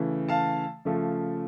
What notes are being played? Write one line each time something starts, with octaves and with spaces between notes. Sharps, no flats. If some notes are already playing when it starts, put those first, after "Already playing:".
Already playing: C#3 E3 A3
F5 A5
C#3 F3 A3